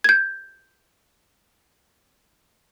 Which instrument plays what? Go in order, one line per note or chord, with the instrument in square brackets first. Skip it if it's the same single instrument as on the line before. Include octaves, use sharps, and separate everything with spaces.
[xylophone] G6 G#6